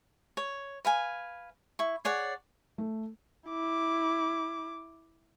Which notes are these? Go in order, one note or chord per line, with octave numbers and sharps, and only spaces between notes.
C#5
B4 F5 G#5
E4 C#6
G#4 C#5 D5 F#5
A3
E4 D6